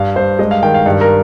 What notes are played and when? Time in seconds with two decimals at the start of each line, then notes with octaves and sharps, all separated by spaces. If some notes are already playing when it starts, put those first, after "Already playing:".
Already playing: G2 F5
0.16 G2 C5
0.39 G#3 D#5
0.51 F5
0.63 D#3 G5
0.74 F5
0.86 G2
1.01 A#4